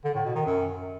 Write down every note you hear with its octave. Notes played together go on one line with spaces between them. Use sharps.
D3
A2
B2
D#3
F#2